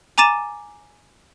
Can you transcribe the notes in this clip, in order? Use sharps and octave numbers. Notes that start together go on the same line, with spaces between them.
G#5 A#5 D6 A6 D#7 E7